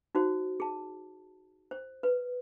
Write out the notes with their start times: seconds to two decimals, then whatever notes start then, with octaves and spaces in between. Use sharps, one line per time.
0.15 D#4 F#4 C5
0.60 G#4 A5
1.71 C5
2.03 B4